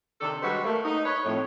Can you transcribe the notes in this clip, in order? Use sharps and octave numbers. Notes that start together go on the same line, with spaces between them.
C3 D#3 D4 A4
G3 G#3 F#4 B4 C5
A3 A#3
D#4
B4 C#5
F2 A2